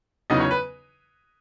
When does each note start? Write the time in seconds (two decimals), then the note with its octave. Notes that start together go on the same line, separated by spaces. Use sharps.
0.30 E2 C#3 F#3 B3 D#4 D#5
0.40 C#5
0.51 B4